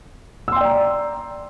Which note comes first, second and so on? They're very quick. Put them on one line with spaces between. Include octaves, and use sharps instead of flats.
E6 C6 G5 D5 A#5